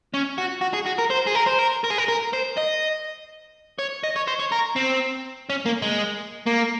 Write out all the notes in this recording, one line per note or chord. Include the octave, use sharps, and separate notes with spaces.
C#4
F#4
F#4
G#4
F#4
A#4
C5
G#4
A#4
C5
A#4
A#4
G#4
A#4
A#4
C5
D#5
C#5
D#5
C#5
C5
C#5
A#4
C4
C#4
A#3
G#3
A#3